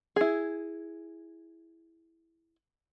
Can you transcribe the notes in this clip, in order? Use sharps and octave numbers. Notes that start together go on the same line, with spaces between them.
E4 G#4